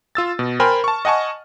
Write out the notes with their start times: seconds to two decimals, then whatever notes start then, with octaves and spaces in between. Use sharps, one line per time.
0.15 F4 E6 A6
0.39 B2
0.60 A#4 C5 G5 G#5 B5 F6
0.84 A5 C#6
1.05 D#5 F#5 G#5 A5 C#6